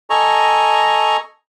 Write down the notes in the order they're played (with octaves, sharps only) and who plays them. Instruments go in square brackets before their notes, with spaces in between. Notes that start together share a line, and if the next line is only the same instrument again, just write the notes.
[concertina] A4 D#5 G#5 A#5 C#6